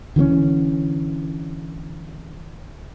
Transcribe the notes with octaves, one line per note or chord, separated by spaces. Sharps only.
D3 E3 A3 C#4